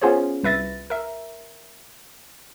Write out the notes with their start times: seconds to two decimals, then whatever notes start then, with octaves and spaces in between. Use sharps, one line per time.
0.01 B3 C#4 F4 G#4 C5 C#5
0.43 C2 B4 E5 A6 A#6
0.90 A#4 E5